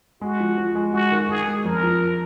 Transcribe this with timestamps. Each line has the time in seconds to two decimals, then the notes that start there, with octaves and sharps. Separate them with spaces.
0.21 G#3 F#4
0.40 F3
0.58 F3
0.75 G#3
0.93 G#3 F#4
1.11 D#3
1.29 D#3 G#4
1.47 G#3
1.65 F2 A#4
1.83 F3